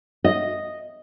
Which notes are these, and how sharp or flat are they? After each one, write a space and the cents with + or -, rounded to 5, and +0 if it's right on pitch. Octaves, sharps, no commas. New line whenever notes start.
D#5 -5